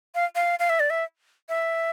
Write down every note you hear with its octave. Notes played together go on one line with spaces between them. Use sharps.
F5
F5
F5
E5
D5
E5
E5